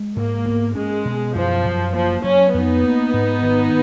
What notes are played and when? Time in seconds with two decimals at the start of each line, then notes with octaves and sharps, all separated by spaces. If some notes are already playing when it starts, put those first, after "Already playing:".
Already playing: G#3
0.16 G#2 A#3
0.46 B3
0.75 G#3 C#4
1.05 B2
1.35 F#2 F3
1.65 F#2
1.94 F3 A#3
2.24 F#3 C#4
2.53 F2 B3 D#4
2.84 A#3
3.14 G#2
3.43 D#3